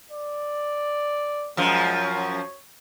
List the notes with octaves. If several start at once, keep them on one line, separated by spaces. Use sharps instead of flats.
D5
F#2 F3 G#3
C#5